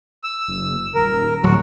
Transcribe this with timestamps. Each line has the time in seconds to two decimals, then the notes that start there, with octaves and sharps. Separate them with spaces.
0.24 E6
0.48 F#1
0.95 D#1 A#4
1.43 D1 F#3 F#4